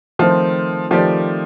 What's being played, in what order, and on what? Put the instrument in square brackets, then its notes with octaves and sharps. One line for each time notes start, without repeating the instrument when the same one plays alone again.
[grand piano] D#3 A3 C4 F4 C5 [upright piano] F3
[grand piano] D#3 A3 C4 G4 D5 [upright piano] F3